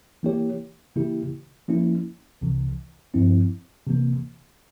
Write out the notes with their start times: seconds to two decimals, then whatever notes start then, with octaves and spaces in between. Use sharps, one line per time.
0.23 E3 A#3 E4 G4 C#5
0.96 C#3 E3 A#3 E4 G4
1.68 F3 A#3 C#4 E4
2.41 C2 C3 E3
3.14 G2 F3 C4 E4
3.87 C3 E3 A#3